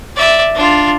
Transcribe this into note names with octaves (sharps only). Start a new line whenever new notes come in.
D5 E5
D4 F4